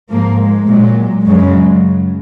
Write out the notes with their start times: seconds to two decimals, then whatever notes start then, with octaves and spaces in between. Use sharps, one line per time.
0.10 G#2 F3 A#3
0.38 G#3
0.67 A#2 F#3 G#3
1.25 F#2 C#3 F#3 G#3